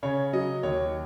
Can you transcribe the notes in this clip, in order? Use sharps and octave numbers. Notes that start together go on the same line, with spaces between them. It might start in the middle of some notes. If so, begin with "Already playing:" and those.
C#3 C#5
F#3 D#5
D#2 C#5